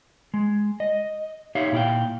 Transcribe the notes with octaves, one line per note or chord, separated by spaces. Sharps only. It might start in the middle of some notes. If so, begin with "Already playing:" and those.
G#3
D#5
D#4 G4 C#5 E5 F5
A#2 E4 F5 G5